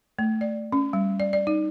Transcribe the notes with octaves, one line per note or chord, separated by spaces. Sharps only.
A3
D5
C#4
G3
D5
D5
D#4